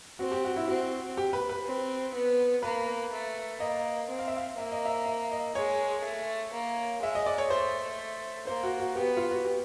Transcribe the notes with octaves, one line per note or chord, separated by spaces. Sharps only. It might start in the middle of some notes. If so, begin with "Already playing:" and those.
C4 F#4
G4
F#4
E4
C4 F#4
G4
B4
B4
C4
B3
A#3 B4
A3
A#3 D#5
C4
F5
E5
F5
A#3 E5
D#5
E5
E5
D#5
G#3 C#5
A3
A#3
G#3 E5
D#5
D5
C#5
A3 C5
A#3 C5
F#4
F#4
B3 G4
F4
F#4
G4